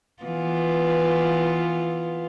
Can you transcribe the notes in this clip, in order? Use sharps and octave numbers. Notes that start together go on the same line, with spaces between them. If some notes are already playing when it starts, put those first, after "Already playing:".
E3 B3 F4